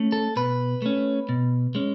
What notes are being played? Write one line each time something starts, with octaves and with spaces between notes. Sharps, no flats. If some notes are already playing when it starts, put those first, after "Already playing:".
Already playing: A3 C#4
A4
B2 B4
A3 C#4
B2
G#3 C#4